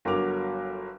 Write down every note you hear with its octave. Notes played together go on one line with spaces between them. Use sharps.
G1 D3 F#3 A#4 D6 F7